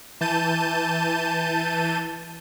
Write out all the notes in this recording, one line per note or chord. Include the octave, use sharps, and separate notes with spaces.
E3 A5 G6 D#7